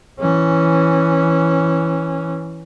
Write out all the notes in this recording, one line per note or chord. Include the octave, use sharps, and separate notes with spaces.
E3 C#4